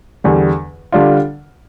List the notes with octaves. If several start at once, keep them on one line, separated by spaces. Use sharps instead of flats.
E2 D3 G3
D3 G3 D4 F4